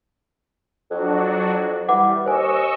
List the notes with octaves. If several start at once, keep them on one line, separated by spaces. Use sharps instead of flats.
F2 F#3 D4 F#4
E3 G3 F#5 D6
D#2 C5 D#5 G#5 C#6 E6